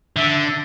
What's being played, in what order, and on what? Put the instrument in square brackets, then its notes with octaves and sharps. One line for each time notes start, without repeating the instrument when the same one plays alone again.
[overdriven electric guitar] D3 [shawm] E5